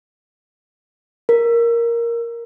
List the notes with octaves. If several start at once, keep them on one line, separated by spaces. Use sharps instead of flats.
A#4